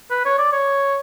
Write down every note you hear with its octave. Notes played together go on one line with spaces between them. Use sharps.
B4
C#5
D5
C#5